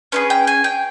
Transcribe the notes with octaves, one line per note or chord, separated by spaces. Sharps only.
C#4 E4 G#4 B4
G5
G#5
G5